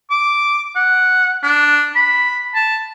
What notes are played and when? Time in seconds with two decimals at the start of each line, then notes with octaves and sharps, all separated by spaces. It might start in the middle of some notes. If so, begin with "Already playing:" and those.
0.10 D6
0.76 F#5
1.43 D4
1.96 B5
2.55 A5